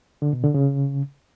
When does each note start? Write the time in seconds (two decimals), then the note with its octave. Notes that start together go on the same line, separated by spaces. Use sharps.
0.22 D3
0.33 B2
0.44 D3
0.54 C#3